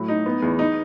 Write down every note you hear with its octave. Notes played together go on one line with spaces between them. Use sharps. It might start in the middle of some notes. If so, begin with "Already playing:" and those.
Already playing: A2 F#3
D#4
B3
E2
D#4